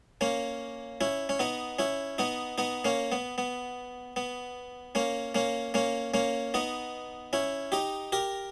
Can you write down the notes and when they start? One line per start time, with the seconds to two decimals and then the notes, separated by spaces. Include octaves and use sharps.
0.21 A#3 C#4
1.01 C#4 E4
1.29 C#4
1.39 B3 D#4
1.79 C#4 E4
2.18 B3 D#4
2.58 B3 D#4
2.85 A#3 C#4
3.12 B3
3.38 B3
4.16 B3
4.95 A#3 C#4
5.35 A#3 C#4
5.74 A#3 C#4
6.14 A#3 C#4
6.54 B3 D#4
7.33 C#4 E4
7.72 D#4 G4
8.12 G4 A#4